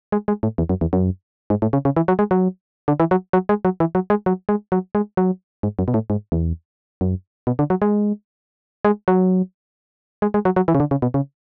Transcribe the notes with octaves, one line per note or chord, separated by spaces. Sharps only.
G#3
G#3
A2
E2
F#2
E2
F#2
G#2
A2
C#3
C#3
E3
F#3
G#3
F#3
D3
E3
F#3
F#3
G#3
F#3
E3
F#3
G#3
F#3
G#3
F#3
G#3
F#3
G#2
F#2
B2
A2
G#2
E2
F#2
B2
D3
F#3
G#3
G#3
F#3
G#3
G#3
F#3
F#3
E3
C#3
D3
C#3
B2
C#3